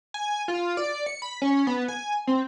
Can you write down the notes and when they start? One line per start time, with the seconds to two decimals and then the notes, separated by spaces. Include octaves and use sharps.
0.14 G#5
0.48 F4
0.77 D5
1.06 C#7
1.22 B5
1.42 C#4
1.67 B3
1.88 G#5
2.27 C4